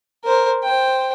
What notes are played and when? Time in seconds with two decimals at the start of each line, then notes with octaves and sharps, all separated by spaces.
0.25 A#4 C5
0.63 C5 G5